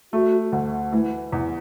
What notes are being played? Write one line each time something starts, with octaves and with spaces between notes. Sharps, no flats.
A3 F#4
D2
E3 A3
E2